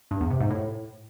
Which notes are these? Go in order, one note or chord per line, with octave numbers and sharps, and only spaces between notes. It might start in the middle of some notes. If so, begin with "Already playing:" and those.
G2
E2
C3
G#2
A2